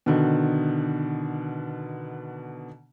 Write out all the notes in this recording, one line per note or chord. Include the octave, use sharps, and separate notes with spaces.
B2 D3 D#3